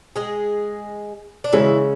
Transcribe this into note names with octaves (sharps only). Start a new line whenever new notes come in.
G#3 G#4
D4
C#3 E3 G#3 C#4 E4